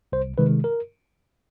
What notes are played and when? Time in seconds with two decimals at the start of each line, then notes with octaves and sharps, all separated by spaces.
0.12 C2 C5
0.38 C3 D#3 G#3 B4
0.64 A#4